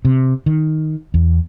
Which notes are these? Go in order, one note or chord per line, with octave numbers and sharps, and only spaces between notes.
C3
D#3
E2